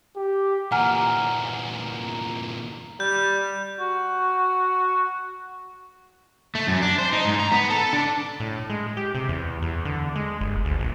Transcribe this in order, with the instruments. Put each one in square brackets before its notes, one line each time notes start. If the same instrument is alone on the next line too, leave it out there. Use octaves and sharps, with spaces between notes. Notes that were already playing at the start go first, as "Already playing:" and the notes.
[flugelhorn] G4
[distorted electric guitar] E2 A#2 [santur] A#3 [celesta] F#5 G#5 F6
[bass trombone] G3 [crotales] G6
[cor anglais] F#4
[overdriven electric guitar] A3
F#2
D4
C5
D#4
G#2
A#5
B3
A4
D4
[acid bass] A2
G#3
G4
C3
E2
E2
D3
G#3
G1
D2
A#1